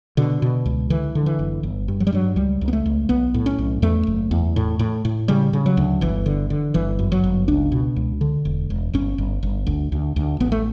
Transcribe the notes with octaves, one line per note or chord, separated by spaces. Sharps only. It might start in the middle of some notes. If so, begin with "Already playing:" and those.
B2 D3
B2
C#2
D3 E3
D3
E3
F#1
G1
G2
F#3
G3
G2 F#3
C#2 G3
C#2
B3
A3
C#2
B1 B3
A2
C#4
B1
E2 A3
F#1
E2
A2
A2
A2
C#3 G3
C#3
F#3
D2
G1 E3
D3
D3
G1 E3
F#2
F#3
G1
C#2 D4
B2
C#2
D3
E1
E1
G1 C#4
G1
G1
D2
D2
D2
A1 B3
A3